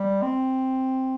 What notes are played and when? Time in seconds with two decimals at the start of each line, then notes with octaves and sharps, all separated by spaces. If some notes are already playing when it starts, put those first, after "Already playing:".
Already playing: G3
0.23 C4